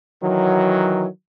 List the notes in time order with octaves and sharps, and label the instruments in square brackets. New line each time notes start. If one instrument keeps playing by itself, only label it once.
[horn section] D#3 E3 F#3